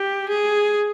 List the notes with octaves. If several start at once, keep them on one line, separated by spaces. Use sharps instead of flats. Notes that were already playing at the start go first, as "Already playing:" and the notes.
Already playing: G4
G#4